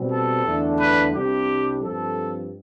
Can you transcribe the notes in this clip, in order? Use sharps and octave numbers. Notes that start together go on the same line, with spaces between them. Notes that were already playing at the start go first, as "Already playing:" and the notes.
Already playing: B2 G3 C4
A4
E2 D3 A3 D4
B4
C2 C3 G3 D4 G4
G2 F3 C4 A4